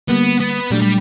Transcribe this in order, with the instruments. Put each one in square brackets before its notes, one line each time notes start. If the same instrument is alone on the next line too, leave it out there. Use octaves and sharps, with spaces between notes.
[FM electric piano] D3 G3 A#3 [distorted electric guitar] B3
[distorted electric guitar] B3
[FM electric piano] A#2 F#3 A3 D4 [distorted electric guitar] G3
[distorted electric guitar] G3